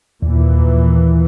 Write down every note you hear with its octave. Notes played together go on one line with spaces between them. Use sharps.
D#2 A#2 E3